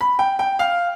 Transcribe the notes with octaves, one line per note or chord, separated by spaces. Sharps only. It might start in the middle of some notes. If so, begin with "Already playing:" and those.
B5
G5
G5
F5